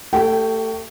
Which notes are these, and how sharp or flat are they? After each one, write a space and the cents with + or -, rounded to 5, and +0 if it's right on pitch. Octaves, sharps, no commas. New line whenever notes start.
A3 +25 G4 +0 G5 -25